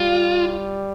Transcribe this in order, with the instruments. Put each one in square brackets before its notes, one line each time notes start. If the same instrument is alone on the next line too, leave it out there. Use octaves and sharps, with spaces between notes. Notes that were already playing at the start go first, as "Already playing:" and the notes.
Already playing: [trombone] G3 [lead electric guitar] F4